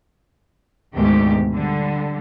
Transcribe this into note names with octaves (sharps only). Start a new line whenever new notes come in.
D2 G#2 B2 D#3 G#3 G4
D3 G3